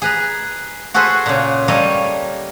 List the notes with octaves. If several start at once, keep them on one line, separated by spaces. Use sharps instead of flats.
G#4 B4 A#5
F#4 G#4 A4 B4 C5
A#2 C#3
G3 A#3 A4 C#5 D#5 F5